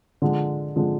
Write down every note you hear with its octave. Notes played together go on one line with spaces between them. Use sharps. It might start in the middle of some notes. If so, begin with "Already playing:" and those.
D3 F3 G#3
D3 F3 G#3